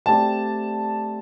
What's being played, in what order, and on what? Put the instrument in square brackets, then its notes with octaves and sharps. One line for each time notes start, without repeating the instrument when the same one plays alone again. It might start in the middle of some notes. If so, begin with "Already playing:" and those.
[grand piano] A3 C4 G4 D5 [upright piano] A5